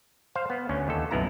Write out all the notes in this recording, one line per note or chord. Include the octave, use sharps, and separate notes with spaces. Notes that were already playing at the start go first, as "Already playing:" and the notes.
C5 F5
B3
D2 C#4
D#2 A4
B1 F#2 B3 E4 A#5